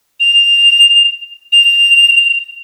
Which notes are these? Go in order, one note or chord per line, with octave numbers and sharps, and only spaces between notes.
F7
F7